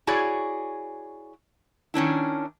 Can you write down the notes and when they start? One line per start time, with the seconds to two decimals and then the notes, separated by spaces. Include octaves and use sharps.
0.07 E4 F#4 G#4 C#5 D5
1.94 D#3 C#4 D4 E4